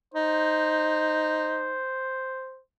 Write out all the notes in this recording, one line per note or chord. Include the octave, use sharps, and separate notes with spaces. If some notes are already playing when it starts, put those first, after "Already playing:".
D#4 C5